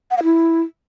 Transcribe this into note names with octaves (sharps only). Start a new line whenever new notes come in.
F#5
F5
E4